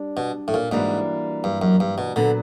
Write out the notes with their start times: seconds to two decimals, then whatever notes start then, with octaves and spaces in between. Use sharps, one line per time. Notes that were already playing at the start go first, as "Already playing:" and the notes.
Already playing: G3 D4
0.17 B2
0.48 A2
0.54 A#2
0.71 G#2 E3 G3 A#3 D4 F#4
1.44 G2
1.62 F#2
1.80 G2
1.98 B2
2.16 A#2 D3 F#3 B3 D4